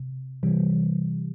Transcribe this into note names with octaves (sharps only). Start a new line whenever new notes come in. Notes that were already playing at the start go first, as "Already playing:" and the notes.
Already playing: C3
C3 E3 G3